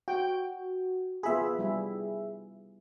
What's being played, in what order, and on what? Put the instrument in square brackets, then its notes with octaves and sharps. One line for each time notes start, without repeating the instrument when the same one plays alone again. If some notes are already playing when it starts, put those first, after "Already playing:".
[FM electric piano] F#4 [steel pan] G5
[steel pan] B3 F4 B5 [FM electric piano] G#4 E5
[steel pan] G3 E4